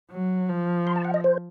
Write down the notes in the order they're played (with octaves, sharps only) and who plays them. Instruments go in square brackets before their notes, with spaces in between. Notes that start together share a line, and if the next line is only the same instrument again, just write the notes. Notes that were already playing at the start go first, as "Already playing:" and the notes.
[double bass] F#3
F3
[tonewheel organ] C6
A5
F#5
D#5
C5